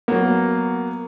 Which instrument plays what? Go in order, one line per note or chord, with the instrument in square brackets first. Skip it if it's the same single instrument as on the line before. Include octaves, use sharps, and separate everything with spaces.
[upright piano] F#3 B3 [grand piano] A#3